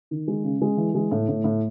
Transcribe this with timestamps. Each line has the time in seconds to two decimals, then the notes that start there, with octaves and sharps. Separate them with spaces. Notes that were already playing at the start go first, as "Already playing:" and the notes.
0.11 D#3
0.28 G#3
0.44 C#3
0.61 G#3
0.77 E3
0.95 G#3
1.11 A2
1.28 A2
1.44 A2